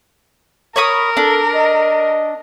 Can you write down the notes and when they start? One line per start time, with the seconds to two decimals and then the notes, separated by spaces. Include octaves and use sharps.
0.76 A#4 C#5 B5 D#6
1.17 D4 A4
1.54 D#5